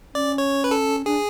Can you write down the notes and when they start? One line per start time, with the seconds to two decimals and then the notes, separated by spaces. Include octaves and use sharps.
0.14 C#4 D5
0.38 C#5
0.64 B4
0.71 A4
1.06 D4 G#4